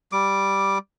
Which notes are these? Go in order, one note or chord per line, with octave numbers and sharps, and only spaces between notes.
G3 D6